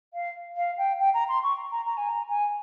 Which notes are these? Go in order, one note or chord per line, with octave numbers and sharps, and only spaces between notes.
F5
F5
G5
G5
A#5
C6
C#6
A#5
A#5
G#5
A#5
G#5